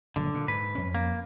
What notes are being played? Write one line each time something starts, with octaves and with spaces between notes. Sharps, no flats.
G1 A#2 D3 F#3
A#2
G#2 B4
F2 C#4
A#3